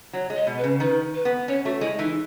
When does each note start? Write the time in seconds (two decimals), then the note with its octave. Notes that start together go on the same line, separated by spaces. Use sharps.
0.13 F#3 C#5
0.30 G#3
0.36 D#5
0.47 B2
0.58 B4
0.64 C#3
0.80 D#3 B4
1.14 B4
1.25 B3
1.48 C#4 C#5
1.65 A3 F#4
1.81 G#3 E4
1.98 E3 D#4